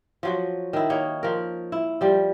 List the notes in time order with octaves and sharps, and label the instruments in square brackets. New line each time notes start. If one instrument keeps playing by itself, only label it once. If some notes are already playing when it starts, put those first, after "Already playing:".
[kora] F3 F#3 F#4
D#3 E4
A#3 D#4 C#5
F3 A#4
E4
F3 G3